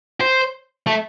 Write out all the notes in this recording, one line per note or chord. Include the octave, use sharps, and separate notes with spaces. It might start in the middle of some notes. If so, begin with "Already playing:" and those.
C5
A3